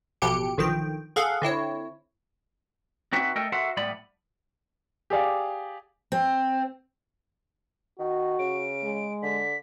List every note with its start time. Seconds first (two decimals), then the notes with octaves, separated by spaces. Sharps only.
0.22 A1 B2 F3 G4 C#7 D7
0.58 B1 D3 D#3 F3 G5
1.16 G#4 A4 F5 F#5
1.42 D3 C4 E4 C#5
3.13 C4 D#4 E4 F#4 B4 F#5
3.36 A3 A4 A#4 D#5 G5
3.52 F#4 A4 A#4 C5 E5 F#5
3.77 A2 G3 B3 D5 B5
5.10 G4 G#4 D5 F5
6.12 C4
7.99 D#3 F#4
8.39 C#3 D7
8.83 G#3
9.23 D3 B6